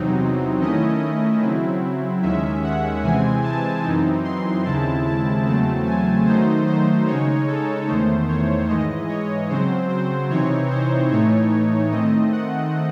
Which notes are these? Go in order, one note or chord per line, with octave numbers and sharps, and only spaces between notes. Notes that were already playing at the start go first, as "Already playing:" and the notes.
Already playing: E2 C3 F#3 C4 D#4
D#3 A3 C#4 E4 D#5
D#5
C#3 F#3 C4 E4
D#2 D#3 G#3 C#4 E5
F#5
C3 E3 G#3 C4 G#5
A5
F#2 E3 C4 D#4
C6
D#2 C#3 G#3 C4 E4 A5
A5
E2 C#3 F#3 A3 C4 A5
G#5
D#3 F#3 A3 D#4 C5
C5
C#3 G#3 D#4 C#5
A4
E2 D#3 A3 C5
C#5
G#2 E3 G#3 D#5
C#5
C#3 F#3 C4 C5
C5
C3 E3 C4 D#4 C#5
C5
A2 E3 A3 D#4 C#5
D#3 A3 C4 D#5
F#5